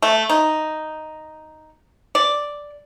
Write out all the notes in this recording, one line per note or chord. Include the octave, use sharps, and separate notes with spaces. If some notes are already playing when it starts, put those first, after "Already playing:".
A3
D#4
D5